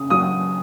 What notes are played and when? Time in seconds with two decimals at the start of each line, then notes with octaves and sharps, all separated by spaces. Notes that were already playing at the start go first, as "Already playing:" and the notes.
Already playing: C#3 D#6
0.10 F#3 D#6